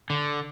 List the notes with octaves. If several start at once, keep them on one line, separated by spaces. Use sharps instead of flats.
D3